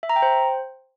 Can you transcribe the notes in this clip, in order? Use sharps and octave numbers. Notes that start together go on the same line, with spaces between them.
E5
A#5
G5
C5